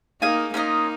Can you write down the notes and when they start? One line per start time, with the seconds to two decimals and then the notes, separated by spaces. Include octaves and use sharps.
0.22 A#3 D#4 G#4 F5 G#5
0.54 A#3 C#4 D#4 F4 A#4 D#5